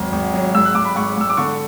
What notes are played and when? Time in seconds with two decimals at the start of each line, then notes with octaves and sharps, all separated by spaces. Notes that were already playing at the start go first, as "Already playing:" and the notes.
Already playing: G#1 F#3
0.12 G#1
0.34 F#3
0.54 G#2 E6
0.65 F#6
0.75 G#2 D6
0.85 B5
0.96 G#2 C#6
1.17 G#2 E6
1.30 D6
1.37 D3 C#6